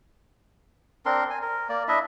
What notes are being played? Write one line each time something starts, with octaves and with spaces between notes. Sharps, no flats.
C4 D4 A#4 C6
G#5
A#4
A#3 D5
D4 E4 D#5 E5